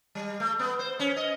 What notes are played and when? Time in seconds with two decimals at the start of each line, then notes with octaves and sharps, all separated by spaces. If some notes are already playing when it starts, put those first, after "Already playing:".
0.15 G3
0.40 A3
0.59 B3
0.79 C5
0.99 C#4
1.16 D#5